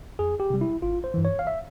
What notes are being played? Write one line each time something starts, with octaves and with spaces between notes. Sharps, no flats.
F2 G#4
G4
C3 G3
E4
G#1 F4
C5
G2 E3
C#5
F5
E5